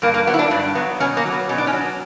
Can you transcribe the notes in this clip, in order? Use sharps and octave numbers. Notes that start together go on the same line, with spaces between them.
G2 A#3
A#3
F#3 B3
E4
D4
G2 D4
F#3 B3
B2 C#4
A#3
F#3
B3
B2 C#4
D4
C#4
F#3